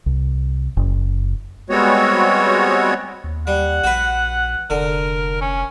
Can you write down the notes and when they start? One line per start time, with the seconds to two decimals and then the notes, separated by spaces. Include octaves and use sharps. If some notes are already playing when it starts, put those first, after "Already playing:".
0.06 C2
0.77 F#1
1.70 G3 G#3 B3 C4 F#4 C#5
3.24 D#2
3.47 G3 F#5
3.84 A#1 F#4 B4
4.70 F1 D3 A#4
5.41 C#4